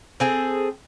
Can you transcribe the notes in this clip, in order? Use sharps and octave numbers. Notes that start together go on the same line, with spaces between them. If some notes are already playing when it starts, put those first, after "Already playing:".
C4 G#4 A4